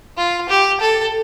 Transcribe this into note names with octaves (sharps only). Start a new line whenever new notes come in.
F4
G4
A4